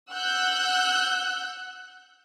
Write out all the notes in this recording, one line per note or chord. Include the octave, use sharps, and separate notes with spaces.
F#5 E6 F#6 G6